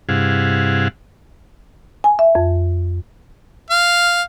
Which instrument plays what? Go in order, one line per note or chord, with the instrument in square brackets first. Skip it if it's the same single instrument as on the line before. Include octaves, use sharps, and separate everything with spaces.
[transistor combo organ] G2 C3 E4 G#4 F5 F#5
[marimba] G#5
E5
F2
[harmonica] F5